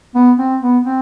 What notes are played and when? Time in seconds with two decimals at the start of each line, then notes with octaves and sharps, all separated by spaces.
0.15 B3
0.39 C4
0.61 B3
0.85 C4